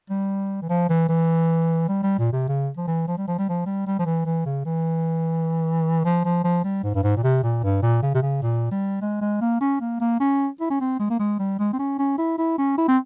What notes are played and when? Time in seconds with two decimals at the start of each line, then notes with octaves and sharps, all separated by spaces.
0.10 G3
0.62 E3
0.69 F3
0.89 E3
1.09 E3
1.88 G3
2.03 G3
2.18 A#2
2.33 C3
2.48 C#3
2.77 F3
2.88 E3
3.08 F3
3.17 G3
3.28 F3
3.38 G3
3.49 F3
3.66 G3
3.87 G3
3.99 F3
4.06 E3
4.26 E3
4.46 C#3
4.65 E3
6.05 F3
6.25 F3
6.44 F3
6.64 G3
6.84 G#2
6.95 G2
7.03 G#2
7.16 A#2
7.23 C3
7.43 A#2
7.63 G2
7.83 A#2
8.02 C#3
8.14 C3
8.22 C#3
8.42 A#2
8.71 G3
9.01 G#3
9.21 G#3
9.41 A#3
9.61 C#4
9.80 A#3
10.00 A#3
10.20 C#4
10.61 E4
10.70 C#4
10.80 C4
11.00 G#3
11.10 A#3
11.19 G#3
11.39 G3
11.59 G#3
11.73 C4
11.79 C#4
11.99 C#4
12.18 E4
12.38 E4
12.58 C#4
12.78 E4
12.88 C4